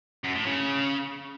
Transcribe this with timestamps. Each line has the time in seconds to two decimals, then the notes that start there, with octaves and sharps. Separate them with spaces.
0.24 F#2
0.35 A2
0.46 C#3